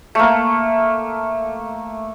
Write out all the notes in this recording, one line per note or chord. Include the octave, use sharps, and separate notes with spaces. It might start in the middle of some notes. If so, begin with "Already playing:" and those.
A3 A#3